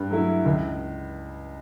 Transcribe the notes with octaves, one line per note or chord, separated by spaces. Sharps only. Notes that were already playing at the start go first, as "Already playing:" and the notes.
Already playing: G2
F#3 A3 E4
C#2